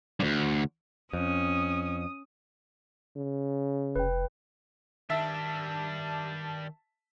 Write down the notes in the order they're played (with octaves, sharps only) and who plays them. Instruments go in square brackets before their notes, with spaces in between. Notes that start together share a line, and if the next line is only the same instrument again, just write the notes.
[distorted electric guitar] D2 G2
[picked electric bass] F2 [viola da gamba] C#4 [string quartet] D#6
[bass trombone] C#3
[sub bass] F1 [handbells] B4 G5
[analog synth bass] D#3 [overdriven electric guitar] G3 D4 [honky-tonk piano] E5 [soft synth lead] A5